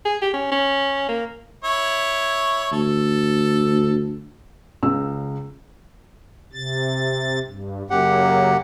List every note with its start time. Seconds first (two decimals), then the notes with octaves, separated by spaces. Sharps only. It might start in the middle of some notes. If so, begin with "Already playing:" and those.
0.05 G#4
0.22 G4
0.33 C#4
0.52 C#4
1.09 A#3
1.64 E4 C#5
2.72 D2 A4
4.83 C#2 C#3 E6
6.53 C3 A6
7.46 G2
7.90 F#2 C#3 F#3 A#3 G4 F#5